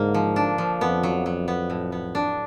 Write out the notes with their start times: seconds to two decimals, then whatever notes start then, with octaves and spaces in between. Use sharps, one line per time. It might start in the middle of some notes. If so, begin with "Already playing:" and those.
Already playing: G#2 D3 A#3
0.14 F3
0.36 D4
0.58 F3
0.81 F2 B3
1.03 F#3
1.26 F#3
1.48 B3
1.70 A2
1.92 B3
2.15 D4